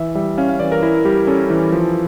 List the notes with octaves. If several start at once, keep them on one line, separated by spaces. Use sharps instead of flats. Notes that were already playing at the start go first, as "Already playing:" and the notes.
Already playing: E3 E5
G3 E5
C#4 F5
F5
E3 D5
A#4
E4 A#4
G3 G4
C#4 A4
E3
F3